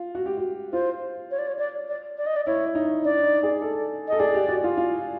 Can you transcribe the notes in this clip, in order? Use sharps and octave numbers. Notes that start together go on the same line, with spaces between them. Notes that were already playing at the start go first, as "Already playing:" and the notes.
Already playing: F4
F#4
G4
F#4
F4 C5
C#5
D5
C#5
D5
D5
D5
D#5
D5
E4 C#5
D#4
D4 D5
D#4
G#4
A4
A4 D#5
G#4 D5
G4
F#4
F4
F4